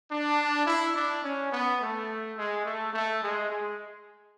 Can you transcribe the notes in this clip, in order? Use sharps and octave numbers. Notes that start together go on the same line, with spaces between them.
D4
E4
D4
C#4
B3
A3
G#3
A3
A3
G#3
G#3